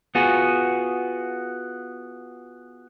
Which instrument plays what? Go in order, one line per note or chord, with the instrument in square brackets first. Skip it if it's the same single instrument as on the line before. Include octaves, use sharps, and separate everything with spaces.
[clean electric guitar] B3 F4 F#4 G#4